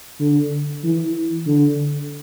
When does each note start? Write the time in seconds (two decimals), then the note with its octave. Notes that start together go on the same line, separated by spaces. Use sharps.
0.20 D3
0.84 E3
1.46 D3